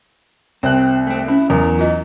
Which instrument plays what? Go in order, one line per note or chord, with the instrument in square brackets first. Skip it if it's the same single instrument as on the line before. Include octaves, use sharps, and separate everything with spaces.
[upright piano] C2 F#6 [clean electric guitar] C4
[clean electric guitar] A3 C4
[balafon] C#4 [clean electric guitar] E4
[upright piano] E2 [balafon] F#3 [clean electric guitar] A#4
[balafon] F4 D#5